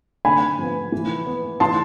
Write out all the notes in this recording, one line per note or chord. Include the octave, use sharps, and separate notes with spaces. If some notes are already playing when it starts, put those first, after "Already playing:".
D3 G#5 B5
F3 B3
E3
B3
E3 A5 C6